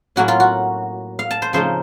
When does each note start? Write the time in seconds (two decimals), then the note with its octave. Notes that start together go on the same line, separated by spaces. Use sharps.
0.16 A2 F#3 A#3 C#4 F#4
0.28 F4
0.40 F#4
1.19 F5
1.31 A5
1.42 C5
1.53 C#3 F3 A3 D#4 C5